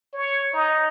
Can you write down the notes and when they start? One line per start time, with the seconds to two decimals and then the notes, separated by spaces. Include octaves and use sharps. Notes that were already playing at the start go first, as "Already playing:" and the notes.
0.14 C#5
0.53 D#4